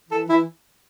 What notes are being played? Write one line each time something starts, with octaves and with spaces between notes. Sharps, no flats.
E3 A4
E3 E4